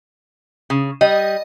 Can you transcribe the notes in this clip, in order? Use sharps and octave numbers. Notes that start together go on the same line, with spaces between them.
C#3
G3 D#5